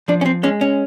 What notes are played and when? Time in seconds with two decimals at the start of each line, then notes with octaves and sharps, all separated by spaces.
0.08 F3 D4
0.21 C#4
0.26 C4
0.43 G#3 C#4
0.61 C#4